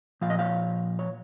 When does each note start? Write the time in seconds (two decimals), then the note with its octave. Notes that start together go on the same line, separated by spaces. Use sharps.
0.21 A#2 F3 F5
0.30 D#5
0.39 C#5 F5
0.99 C#5